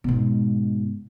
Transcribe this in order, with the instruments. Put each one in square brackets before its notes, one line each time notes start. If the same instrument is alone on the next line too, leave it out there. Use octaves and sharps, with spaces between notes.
[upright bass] G#2 B2